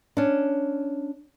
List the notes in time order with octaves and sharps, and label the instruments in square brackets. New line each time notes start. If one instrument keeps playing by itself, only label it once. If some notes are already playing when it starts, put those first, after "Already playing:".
[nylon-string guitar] C#4 D4